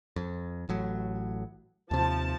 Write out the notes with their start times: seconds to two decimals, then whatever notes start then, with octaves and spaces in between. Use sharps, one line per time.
0.16 F2
0.69 A1 A2 F#3
1.91 D#2 C3 F3 A5